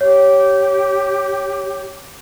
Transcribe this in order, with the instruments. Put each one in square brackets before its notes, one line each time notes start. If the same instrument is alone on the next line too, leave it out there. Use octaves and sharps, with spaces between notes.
[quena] G4 [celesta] C#5